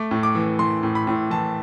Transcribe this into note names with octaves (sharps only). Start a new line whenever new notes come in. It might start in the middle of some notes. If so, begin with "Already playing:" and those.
Already playing: A3 D6
A2
D6
E3
E3 C6
A2
B5
A2
E3 A5